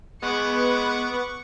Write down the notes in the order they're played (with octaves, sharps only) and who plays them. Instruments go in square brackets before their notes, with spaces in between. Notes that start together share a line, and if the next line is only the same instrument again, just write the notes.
[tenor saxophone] G#3 [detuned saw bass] B3 [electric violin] F#5 D6 [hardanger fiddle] C#6